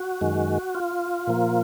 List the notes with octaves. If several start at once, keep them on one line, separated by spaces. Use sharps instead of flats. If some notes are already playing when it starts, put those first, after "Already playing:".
Already playing: F#4
F#2 D#3 G#3
F4
A#2 F3 A#3